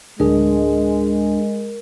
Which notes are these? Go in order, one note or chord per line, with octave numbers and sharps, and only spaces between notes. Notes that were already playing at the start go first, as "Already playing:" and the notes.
D1 G#3 D4 G#4 A#4